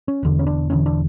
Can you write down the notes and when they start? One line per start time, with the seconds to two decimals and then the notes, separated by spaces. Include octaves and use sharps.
0.08 C#4
0.23 E1 E2 D3
0.39 C#4
0.47 D4
0.70 E1 E2 D3 C#4
0.86 D4